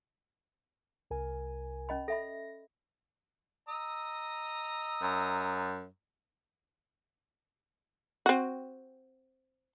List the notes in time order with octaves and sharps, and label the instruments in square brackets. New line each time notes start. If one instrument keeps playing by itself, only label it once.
[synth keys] C2 A#4 G#5
[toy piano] C#4 D#5 B5
[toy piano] A4 E5 B5 [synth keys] A#6
[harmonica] D#5 A#5 E6
[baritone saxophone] F#2
[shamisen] C4 F#4